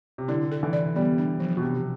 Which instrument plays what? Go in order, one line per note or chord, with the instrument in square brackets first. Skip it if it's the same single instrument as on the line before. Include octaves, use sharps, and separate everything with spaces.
[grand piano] C3
[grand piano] D3 [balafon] E4
[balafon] A4
[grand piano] E3
[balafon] D5
[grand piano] G3 [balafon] B3
[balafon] D4
F3
[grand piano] B2
[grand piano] C3 [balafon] G4